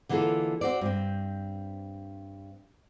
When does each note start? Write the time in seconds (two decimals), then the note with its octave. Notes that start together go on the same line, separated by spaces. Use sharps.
0.09 D3 E3 A#3 F4 G#4 A4
0.61 C4 F#4 C5 D5
0.81 G2 C4